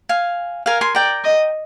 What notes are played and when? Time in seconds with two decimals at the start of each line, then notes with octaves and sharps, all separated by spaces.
0.09 F5 G#5
0.66 A#4 F5 G#5
0.81 G#5 C6
0.95 D5 G5 A#5
1.24 D#5